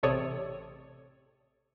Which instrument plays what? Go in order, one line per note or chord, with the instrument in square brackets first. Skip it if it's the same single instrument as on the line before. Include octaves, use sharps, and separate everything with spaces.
[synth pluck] A1 C3 A4 C#5 D5 D#6